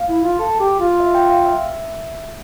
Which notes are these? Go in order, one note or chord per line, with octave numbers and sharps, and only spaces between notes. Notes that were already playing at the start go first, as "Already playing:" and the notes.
Already playing: F5
E4
F4
A4
G4
F4
E5
G5
F5
E5